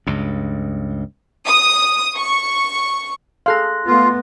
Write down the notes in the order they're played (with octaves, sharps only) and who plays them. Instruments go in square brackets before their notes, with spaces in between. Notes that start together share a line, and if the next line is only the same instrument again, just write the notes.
[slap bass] C#2 G2
[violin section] D#6
C#6
[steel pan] G#4 A4 F5 [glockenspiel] C6 F#6 A#6
[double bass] A3 B3 [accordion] F4